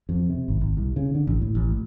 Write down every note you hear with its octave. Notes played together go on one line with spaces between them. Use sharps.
F2
C3
G#1
G#1
C2
C#3
D3
A1
A2
A1
A2